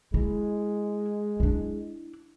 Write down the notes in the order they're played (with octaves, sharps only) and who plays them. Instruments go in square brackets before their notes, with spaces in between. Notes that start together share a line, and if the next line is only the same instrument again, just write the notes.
[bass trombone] G#3 [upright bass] E4
[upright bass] D4 E4